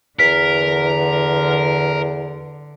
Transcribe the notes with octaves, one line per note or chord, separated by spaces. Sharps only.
E2 D3 A#4 B6